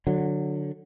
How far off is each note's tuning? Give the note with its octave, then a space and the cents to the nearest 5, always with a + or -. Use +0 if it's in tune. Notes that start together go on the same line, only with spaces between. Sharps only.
D3 +10 F#3 -15